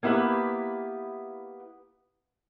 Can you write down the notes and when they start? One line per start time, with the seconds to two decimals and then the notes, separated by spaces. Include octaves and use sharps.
0.03 A#3 B3 E4 G4 B4